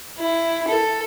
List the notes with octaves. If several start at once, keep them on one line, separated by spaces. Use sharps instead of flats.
E4
A4